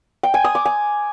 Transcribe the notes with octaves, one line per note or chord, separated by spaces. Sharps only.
G5
G#5
D#6
D6
G#5